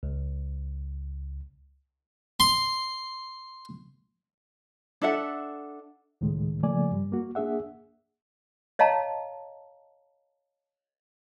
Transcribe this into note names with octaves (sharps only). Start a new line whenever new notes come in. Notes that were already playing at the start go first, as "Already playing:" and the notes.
C#2
C6
D4 A4 E5 F#5
C#2 A2 D#3 G#3
C#3 F3 A3 A#3 D5 G#5
G2 G3
A#3 F#4
A#3 D4 G#4 E5 F#5
C#5 D#5 F5 A5 A#5